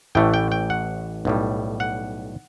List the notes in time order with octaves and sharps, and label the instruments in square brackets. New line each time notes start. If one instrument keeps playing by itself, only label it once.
[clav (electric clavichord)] A1 A2 E3 A3 G5
G5
G5
F#5
B1 A2 G3
F#5